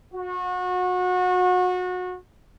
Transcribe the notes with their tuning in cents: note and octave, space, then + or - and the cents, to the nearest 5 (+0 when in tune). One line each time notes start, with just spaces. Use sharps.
F#4 -30